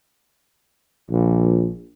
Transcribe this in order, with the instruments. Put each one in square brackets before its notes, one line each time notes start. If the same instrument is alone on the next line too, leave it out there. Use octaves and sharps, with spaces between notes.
[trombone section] A#1